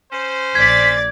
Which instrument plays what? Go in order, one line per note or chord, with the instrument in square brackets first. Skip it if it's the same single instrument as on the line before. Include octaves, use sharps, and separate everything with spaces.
[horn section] C#4 C5
[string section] A#1 D5 A6 [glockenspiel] G#6 [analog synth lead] B6